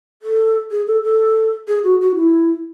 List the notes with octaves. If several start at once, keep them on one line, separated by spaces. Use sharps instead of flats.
A4
G#4
A4
A4
G#4
F#4
F#4
E4